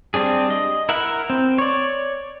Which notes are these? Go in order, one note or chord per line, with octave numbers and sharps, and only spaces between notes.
G3 C4 D4 G#4
D#5
E4 A#4 E5 F#5
C4
C#5 D5